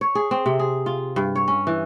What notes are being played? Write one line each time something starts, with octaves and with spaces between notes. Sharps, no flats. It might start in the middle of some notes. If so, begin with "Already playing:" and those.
C#5
G#4
C4
C3
G#4
F4
G2
C#5
C#4
E3